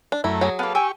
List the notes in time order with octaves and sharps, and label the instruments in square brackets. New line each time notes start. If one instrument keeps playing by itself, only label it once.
[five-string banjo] D4
[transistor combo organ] F#2 A3 A#5 [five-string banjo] E4
[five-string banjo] F#3 G#4
[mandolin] A#3 B3 [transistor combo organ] A4 B4 F5
[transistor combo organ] G4 C#6 [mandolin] G5 G#5 E6